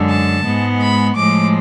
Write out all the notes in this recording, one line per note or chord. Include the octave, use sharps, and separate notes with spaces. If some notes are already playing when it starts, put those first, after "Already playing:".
Already playing: F#2 D3 G#3
A5
G#2 G#3 B3
B5
A2 F3 G#3 D6